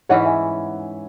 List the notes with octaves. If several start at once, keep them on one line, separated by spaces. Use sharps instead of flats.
G#2 E3 C#4 E4 C#5 F#5
E5 G#5